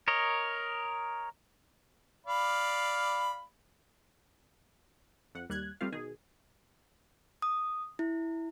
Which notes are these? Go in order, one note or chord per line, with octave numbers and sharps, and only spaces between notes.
A#4 C#5 D#5
D5 F5 B5
F2 F#5
D#2 G3 F#6 G#6
G3 A3 C4 F4 F5
B2 D#3 G#4
D#6
E4